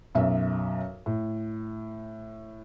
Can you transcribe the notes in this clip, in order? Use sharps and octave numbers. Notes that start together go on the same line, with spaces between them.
B1 F#2 E5
A2